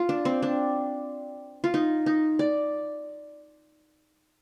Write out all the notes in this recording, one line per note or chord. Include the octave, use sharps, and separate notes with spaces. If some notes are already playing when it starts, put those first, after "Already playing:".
Already playing: F4
D4
C4
D4
F4
D#4
D#4
D5